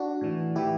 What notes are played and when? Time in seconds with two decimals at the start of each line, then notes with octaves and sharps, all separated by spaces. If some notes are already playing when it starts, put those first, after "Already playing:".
Already playing: D4 F#4
0.21 A2 E3
0.55 A2 E3 E4 G4